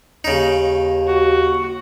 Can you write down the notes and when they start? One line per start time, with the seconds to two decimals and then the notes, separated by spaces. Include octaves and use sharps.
0.24 D#2 C#3 D#4
1.07 F#4